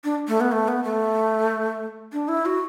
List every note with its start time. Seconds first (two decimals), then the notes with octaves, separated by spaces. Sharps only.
0.04 D4
0.28 A3
0.41 B3
0.52 A3
0.68 B3
0.84 A3
2.13 D4
2.28 E4
2.46 F#4